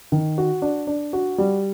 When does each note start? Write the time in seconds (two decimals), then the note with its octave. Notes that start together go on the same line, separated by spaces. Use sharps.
0.12 D#3
0.38 F#4
0.62 D4
0.87 D4
1.13 F#4
1.38 G3